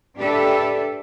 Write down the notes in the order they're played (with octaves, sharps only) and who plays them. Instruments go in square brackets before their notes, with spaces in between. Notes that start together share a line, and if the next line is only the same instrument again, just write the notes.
[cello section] D4 G4 A4 B4 D5 E5